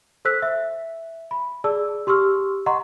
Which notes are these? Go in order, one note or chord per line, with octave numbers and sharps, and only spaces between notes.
A4 C5 E6 F#6 B6
E5
B5
G#4 D5 A5 E6
G4 C6 C#6 E6 F6
D#5 F#5 A#5 C6 C#6